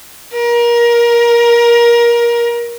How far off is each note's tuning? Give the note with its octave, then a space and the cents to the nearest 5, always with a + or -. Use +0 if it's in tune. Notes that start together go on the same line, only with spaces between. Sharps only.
A#4 +25